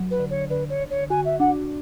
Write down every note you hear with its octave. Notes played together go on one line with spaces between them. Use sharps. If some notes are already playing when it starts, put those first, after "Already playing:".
Already playing: F#3
B4
D3
C#5
D3 B4
C#5
D3
C#5
F#4 G#5
E5
D4 F#5